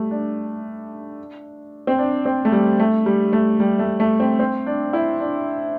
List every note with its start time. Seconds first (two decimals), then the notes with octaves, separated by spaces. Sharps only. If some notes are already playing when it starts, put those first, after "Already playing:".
Already playing: G3 A3
0.11 D4
1.87 C4
1.98 D4
2.25 C4
2.45 A3
2.52 G3
2.79 A3
3.06 G3
3.33 A3
3.60 G3
3.79 A3
4.00 A3
4.20 C4
4.39 C4
4.66 D4
4.93 E4
5.20 D4